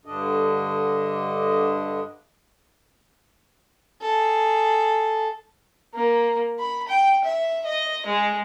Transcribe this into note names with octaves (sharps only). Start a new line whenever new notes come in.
G2 D3 D4 D#5
G#4 A4
A#3
B5
G5
E5
D#5
G#3